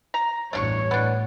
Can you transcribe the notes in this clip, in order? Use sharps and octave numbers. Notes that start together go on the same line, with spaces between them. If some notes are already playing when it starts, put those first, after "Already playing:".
A#5
A1 E2 G2 D4 C#5 F5 C#6
A2 B3 D4